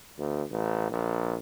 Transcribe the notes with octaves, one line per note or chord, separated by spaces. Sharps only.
D2
A1
A#1